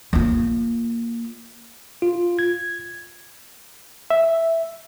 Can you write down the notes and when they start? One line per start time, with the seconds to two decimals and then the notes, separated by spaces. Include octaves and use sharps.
0.13 A#3 F4
2.02 F4
2.39 G#6
4.10 E5